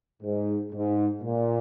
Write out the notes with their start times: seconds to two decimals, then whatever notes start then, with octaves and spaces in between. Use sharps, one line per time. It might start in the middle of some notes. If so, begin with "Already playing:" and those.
0.23 G#2
0.73 G#2
1.22 A#2